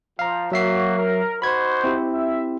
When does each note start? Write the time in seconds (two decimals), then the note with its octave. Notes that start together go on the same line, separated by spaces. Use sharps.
0.19 F3 F5 A#5
0.52 F#3 A#3 F#4 E5 C7
0.98 A#4
1.42 D#4 F#4 C5 B5 G#6
1.84 C4 E4 G4
2.13 E5